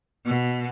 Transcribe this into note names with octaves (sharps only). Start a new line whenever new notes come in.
B2